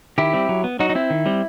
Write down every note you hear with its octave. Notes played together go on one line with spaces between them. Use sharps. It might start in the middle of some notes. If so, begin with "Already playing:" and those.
D#3 E4 G4
G3 C4
F#3
B3
F#3 D#4 F#4
D#4
C4 E4
D#3
G3 C4